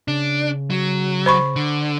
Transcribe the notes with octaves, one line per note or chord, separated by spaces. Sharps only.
C#3 D4
F#3
C5 B5 C#6
D3